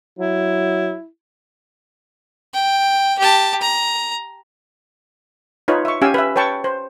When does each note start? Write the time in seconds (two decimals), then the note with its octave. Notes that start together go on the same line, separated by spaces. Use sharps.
0.19 F#3 E4
2.54 G5
3.19 G4 A5
3.61 A#5
5.68 D#4 F4 B4 C#5
5.85 E5 C#6
6.02 C#4 G4 F5 G#5 E6
6.14 B4 E5
6.36 B4 C#5 G5 A5 C#6
6.64 C5